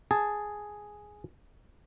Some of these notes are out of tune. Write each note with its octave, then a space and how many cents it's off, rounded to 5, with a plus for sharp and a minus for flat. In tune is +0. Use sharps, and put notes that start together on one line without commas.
G#4 +0 A5 +0